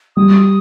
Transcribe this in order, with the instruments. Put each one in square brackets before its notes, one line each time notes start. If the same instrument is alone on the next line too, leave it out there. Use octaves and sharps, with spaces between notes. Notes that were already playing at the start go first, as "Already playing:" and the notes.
[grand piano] G3 [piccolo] D#6